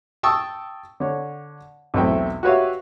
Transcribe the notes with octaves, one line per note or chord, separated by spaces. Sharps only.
G5 A5 C#6 D#6 E6
D3 C#5
B1 E2 A3 C4 E4 G5
F#4 G4 B4 C#5 E5 F5